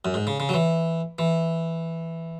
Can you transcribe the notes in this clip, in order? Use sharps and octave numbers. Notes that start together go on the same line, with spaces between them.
F#2
G#2
C#3
C#3
F#3
E3
E3